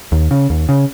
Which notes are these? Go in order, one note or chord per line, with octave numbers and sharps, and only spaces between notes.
D#2
C#3
D#2
C#3